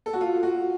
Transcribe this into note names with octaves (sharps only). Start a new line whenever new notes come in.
A4
F#4
F4
F#4